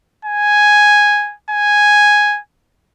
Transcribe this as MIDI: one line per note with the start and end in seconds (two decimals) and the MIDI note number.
0.25 1.34 80
1.50 2.39 80